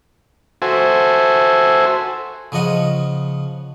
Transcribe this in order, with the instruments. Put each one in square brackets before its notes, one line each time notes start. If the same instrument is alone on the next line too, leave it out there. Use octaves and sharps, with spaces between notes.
[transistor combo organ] F#4 A4 C5 E5 G#5
[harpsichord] C#3 F3 D#5 F#5